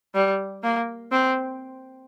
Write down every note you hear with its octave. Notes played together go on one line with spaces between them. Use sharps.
G3
A#3
C4